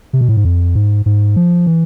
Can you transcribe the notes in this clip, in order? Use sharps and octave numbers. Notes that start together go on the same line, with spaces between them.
C3
B2
A2
G#2
F2
G#2
G#2
F3
E3